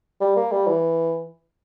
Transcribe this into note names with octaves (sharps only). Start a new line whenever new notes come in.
G3
A#3
G3
E3